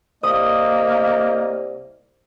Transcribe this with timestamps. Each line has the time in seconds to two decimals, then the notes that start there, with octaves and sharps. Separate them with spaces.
0.23 C2 A#3 D#5 D#6